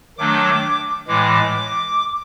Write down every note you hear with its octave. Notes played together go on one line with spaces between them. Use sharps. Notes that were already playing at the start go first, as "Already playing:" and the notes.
D#3 F#3 A3 D4 D6
A2 E3 G#3 D6